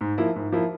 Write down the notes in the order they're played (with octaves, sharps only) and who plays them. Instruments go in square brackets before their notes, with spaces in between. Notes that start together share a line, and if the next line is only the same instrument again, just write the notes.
[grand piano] G#2
F3 A#3 E4
G#2
F3 A#3 E4